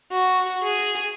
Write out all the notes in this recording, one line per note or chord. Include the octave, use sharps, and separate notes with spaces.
F#4
G#4